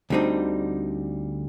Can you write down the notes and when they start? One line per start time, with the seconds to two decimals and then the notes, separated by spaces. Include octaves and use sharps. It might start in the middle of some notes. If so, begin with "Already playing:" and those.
0.10 D2 D3 G3 C4 D#4